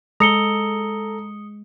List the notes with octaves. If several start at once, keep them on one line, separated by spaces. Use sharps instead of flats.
G#3 A4 A#5 D#6 C#7 G7